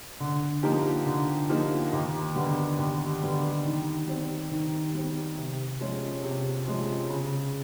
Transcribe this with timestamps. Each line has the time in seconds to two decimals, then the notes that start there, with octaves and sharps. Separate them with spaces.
0.20 D3
0.63 F3 A#3 D#4 G4
1.06 D3
1.49 F3 A#3 D#4 G4
1.92 D#2
2.35 D3 G3 B3
2.78 D#2
3.22 D3 G3 B3
3.65 D#3
4.07 G3 C4
4.51 D#3
4.94 G3 C4
5.37 C3
5.80 F3 G#3 C#4
6.23 C3
6.66 F3 G#3 C#4
7.10 C#3